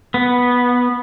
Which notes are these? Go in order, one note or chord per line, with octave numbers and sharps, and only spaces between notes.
B3